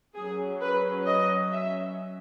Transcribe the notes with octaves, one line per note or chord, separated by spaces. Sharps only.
F#3 C#4 G#4
B4
D#5
E5